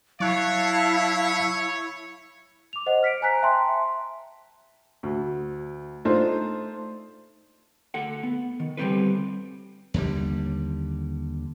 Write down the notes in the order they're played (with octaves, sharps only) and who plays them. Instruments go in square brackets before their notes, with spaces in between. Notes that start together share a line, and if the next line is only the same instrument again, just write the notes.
[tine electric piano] F#3 C#6 F#6 [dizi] E4 [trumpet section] C#5 [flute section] F5 A5
[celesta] D6 F7
C5 D#5 F#5
F6 B6 C#7 D7
C5 G#5 A#5 F#6 B6
E5 G5 A5 A#5 C6
[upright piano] D2
A3 D4 D#4 F4 C5
[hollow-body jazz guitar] D2 A4 F#5
B3
D#3
D3 G3 A#3 C4 A4 B4
[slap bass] D#2 D3 G3